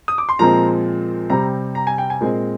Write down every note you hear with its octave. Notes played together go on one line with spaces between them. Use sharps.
D#6
D6
C6
A#2 F3 G#3 C4 A#5
C3 G3 C4 A#5
A#5
G#5
G5
G#5
A#2 G#3 C4